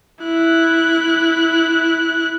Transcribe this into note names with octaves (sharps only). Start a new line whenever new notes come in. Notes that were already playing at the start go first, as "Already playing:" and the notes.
E4 F#6